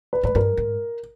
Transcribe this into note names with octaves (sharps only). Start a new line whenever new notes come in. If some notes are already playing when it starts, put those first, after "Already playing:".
B4
G#2 B4
G2 A#4
G#2